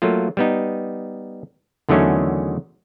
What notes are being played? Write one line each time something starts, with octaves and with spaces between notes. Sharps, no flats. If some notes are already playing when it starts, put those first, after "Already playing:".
F#3 A3 A#3 F4
G3 B3 D#4
E2 D3 D#3 F#3 A3 C#4